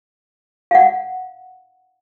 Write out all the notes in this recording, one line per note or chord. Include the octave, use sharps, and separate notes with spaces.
F5 F#5